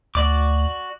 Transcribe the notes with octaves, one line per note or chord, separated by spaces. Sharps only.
D2 F#4 D5 D6